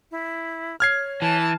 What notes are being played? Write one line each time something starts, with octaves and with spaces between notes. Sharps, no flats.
E4
C#5 F6 G#6 C7
E3 A5